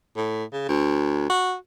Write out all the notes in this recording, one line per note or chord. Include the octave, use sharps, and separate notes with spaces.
A2
C#3
D2
F#4